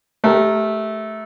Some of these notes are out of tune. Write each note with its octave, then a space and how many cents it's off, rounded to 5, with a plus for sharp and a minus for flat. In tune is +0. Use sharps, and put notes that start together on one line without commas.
A3 -15 G4 +0 A#4 +0